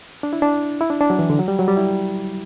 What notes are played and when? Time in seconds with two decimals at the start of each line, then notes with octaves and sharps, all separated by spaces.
0.23 D4
0.33 E4
0.42 D4
0.81 E4
0.90 D4
1.01 D4
1.10 F#3
1.19 E3
1.30 D3
1.39 F#3
1.48 G3
1.59 F#3
1.68 G3
1.77 E4